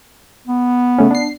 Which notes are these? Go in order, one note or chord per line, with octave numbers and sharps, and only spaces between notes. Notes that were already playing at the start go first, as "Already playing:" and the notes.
B3
C#3 A3 C#4
D4 C7